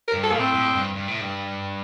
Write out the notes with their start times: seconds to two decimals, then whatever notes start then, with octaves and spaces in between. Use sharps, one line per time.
0.08 A#4
0.13 G2
0.23 A4
0.32 A2 A#3
0.39 C4
0.54 A2
0.75 G2
0.95 G2
1.08 A2
1.21 G2